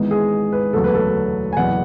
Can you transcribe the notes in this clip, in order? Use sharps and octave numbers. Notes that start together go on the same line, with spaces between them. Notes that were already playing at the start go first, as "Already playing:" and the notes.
Already playing: G#1 G#2 E3 B3
G#4
B4
E1 D2 C#3 F#3 B3 A4
B4
A4
G#5
F#1 E2 B2 F#3 B3 F#5